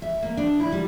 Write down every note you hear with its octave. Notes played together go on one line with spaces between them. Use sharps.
E5
A#3
D4
E4
G3